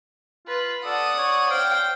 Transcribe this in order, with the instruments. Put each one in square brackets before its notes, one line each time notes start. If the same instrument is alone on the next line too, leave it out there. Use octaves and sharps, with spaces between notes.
[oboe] F4 [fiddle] B4
[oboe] A4 [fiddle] D5 [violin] F#5 D#6
[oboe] C#5
[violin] C5 G5 [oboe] F5